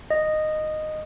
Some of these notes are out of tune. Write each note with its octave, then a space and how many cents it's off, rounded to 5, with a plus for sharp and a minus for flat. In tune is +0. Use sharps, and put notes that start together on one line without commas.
D#5 -10